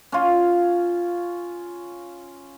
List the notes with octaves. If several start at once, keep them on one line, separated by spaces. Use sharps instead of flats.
C#4 F4